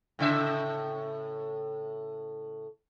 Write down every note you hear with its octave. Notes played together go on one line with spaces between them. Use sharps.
A2 C#3 E5